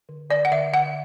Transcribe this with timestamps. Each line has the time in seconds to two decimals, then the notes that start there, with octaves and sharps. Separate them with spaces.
0.09 D3
0.30 D3 D5
0.45 F#5
0.51 D3 E5
0.73 D3 F#5